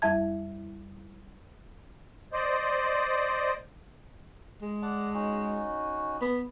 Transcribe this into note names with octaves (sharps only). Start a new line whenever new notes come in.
F2 G3 E4 E5 A5 G#6
C5 D5 D#5
G#3
D5 F#5 A5
C#4 D#4 F#4
B3